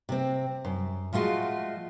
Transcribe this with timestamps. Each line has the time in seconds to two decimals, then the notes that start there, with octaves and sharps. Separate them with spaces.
0.09 C3 C4
0.65 F#2
1.13 F3 G#3 A3 F4 F#4